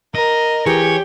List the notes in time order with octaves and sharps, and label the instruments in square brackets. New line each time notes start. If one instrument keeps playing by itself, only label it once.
[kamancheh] A#4 [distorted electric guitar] D#5
[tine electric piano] E3 G#4 G#5 [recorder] G4 [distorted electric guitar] C#5